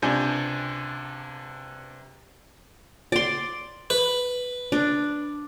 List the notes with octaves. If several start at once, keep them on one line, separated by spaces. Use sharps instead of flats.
C#2 C3 D4 G#5 G6
D5 C6
B4
D4